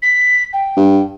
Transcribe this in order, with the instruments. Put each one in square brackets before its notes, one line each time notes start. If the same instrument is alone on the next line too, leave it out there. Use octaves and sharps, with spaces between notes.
[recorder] B6
G5
[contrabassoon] G2